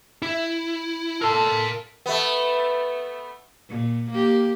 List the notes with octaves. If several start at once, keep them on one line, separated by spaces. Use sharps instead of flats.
E4
A4 A#4 C6
A3 B3
A#2
A#3 G4